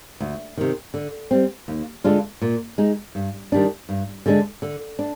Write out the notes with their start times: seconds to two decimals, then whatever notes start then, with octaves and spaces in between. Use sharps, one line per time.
0.20 D2
0.57 C3 D#3
0.94 D3
1.31 G3 C4
1.68 D#2
2.04 D3 G#3 D4 F4
2.42 A#2
2.78 G#3 D#4
3.15 G2
3.52 D#3 G3 D4
3.89 G2
4.26 D3 G#3 D4
4.62 D3
4.99 D4